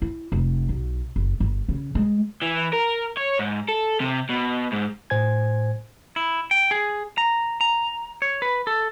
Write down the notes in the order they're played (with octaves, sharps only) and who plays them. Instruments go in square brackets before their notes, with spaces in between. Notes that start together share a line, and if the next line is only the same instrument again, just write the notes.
[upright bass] E4
F1
B1
F#1
G1
C#3
G#3
[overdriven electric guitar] E3
A#4
C#5
G#2
A4
C3
B2
G#2
[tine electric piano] A2 C5 G#5 G#6
[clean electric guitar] E4
G5
G#4
A#5
A#5
C#5
B4
A4